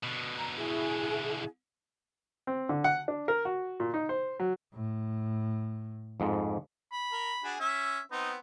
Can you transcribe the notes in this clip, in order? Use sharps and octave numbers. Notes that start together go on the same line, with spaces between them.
B2 D3
A#5
E4 G#4
C4
D3
F#5
D4
A#4
F#4
A#2
D#4
C5
F#3
A2
F2 G#2
B5
A#4
D4 F#4 G#4
C#4 E5
B3 C4 D#4